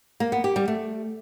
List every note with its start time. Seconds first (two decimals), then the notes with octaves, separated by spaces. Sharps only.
0.20 A#3
0.32 B3
0.44 G4
0.56 G3
0.68 A3